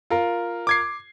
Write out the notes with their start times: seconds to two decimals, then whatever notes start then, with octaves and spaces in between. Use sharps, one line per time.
0.10 F4 A#4
0.67 D6 G#6 C7